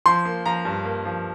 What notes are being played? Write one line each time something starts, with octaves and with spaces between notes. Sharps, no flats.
F3 C6
A#3
F3 A#5
G2
A#3
F3